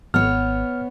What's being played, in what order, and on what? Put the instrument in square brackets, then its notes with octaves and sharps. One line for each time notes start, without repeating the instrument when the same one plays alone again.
[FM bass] G#1 [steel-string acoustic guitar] B3 C#5 [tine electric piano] F6